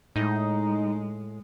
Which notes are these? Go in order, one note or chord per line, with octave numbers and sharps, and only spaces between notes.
A2 G#3 D#4